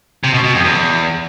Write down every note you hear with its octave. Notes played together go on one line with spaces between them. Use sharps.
C3
B2
B2
F2
E2